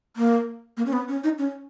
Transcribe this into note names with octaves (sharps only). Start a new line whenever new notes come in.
A#3
A#3
C#4
B3
C#4
D#4
C#4